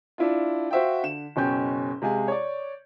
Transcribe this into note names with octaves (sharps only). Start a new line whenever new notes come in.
D4 E4 F4
F#4 C5 E5 F5 G5
D3 E7
F#1 B2 C#4 G5 G#5 G6
C3 G#3 F5 G#5
C#5 D5